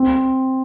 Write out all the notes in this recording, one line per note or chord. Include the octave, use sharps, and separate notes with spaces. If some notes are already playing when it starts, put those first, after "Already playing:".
Already playing: C4